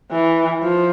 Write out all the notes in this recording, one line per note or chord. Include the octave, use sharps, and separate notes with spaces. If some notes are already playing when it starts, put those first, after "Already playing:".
E3
F3